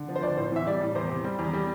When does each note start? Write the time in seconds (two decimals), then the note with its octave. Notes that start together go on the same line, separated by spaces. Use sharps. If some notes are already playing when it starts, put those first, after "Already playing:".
Already playing: D3
0.09 F3
0.15 C5
0.23 D2 D5
0.37 A2 C5
0.52 E3 E5
0.67 G3 D5
0.81 A2
0.95 E2 C5
1.09 C3
1.24 G3
1.39 E2
1.53 G3